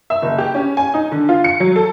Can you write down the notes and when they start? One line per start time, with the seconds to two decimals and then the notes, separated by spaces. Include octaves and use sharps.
0.10 E5
0.22 F#1
0.38 G4
0.54 C#4
0.77 G#5
0.94 D#4
1.12 D3
1.29 F4
1.44 C#7
1.60 F#3
1.76 A4